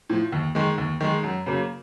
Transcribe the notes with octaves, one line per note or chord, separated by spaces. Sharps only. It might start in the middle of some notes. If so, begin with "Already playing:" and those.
A2 F3
D#2
D#3 G#3
D#2
D#3 G#3
F#2
C#3 F#3 A#3